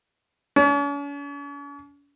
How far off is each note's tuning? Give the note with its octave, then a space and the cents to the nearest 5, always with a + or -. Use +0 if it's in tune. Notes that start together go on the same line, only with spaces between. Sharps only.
C#4 +45